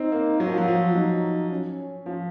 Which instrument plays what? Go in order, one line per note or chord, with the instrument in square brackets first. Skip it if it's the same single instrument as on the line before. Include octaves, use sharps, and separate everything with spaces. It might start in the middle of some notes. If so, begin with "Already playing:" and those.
Already playing: [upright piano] C4 [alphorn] D#4
[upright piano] A#3
[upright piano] F#3 [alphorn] F4
[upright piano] F3
F#3
F3
[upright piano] F#3 [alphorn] D#4
[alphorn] C#4
[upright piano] F3